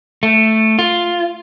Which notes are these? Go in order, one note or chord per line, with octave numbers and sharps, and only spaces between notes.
A3
F4